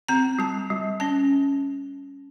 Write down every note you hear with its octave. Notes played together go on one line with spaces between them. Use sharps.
C4 A#5
G3 A5
G3
C#4 A5